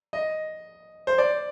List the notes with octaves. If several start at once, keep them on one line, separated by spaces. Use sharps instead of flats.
D#5
C5
D5